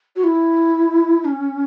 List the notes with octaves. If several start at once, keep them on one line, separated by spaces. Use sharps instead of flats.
F#4
E4
C#4